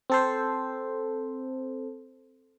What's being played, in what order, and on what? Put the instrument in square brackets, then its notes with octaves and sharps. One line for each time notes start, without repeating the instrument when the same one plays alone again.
[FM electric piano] C4 A4 C5